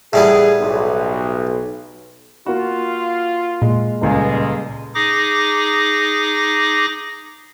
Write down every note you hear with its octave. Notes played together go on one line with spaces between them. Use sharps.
A2 G3 B3 G#4
B1
A#3 F4 F#4
A#2 G#3
D#1 C#2 G3 G#3 G#5
D#4 G#4 D6 A#6